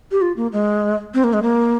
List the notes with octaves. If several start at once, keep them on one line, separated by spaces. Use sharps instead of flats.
G4
F4
A#3
G#3
C4
A#3
G#3
A#3